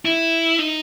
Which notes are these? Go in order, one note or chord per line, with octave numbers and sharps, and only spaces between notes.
E4
D#4